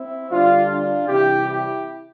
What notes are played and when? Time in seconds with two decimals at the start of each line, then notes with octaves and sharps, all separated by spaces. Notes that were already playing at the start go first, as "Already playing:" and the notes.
Already playing: C4 E4
0.30 D3 G3 D4 F4
0.69 D4 F4
1.08 C3 E3 G3 E4 G4
1.46 E4 G4